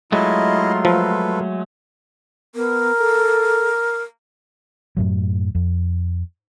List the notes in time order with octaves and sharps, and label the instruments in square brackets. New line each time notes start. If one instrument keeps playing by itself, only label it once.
[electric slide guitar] F#3 G#3 A3 [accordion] E4 D#5 [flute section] F4 A#5 C6
[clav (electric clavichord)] F3 [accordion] A4 B4
[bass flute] B3 [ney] A#4
[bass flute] A4
[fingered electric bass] F#2 A2 F#3
F2